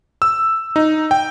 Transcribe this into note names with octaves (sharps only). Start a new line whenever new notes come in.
E6
D#4
G5